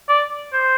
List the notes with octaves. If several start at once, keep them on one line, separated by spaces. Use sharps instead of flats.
D5
C5